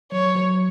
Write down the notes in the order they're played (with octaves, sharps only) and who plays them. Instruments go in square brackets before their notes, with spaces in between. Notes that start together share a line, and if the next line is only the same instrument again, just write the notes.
[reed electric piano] F#3 [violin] C#5
[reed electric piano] F#3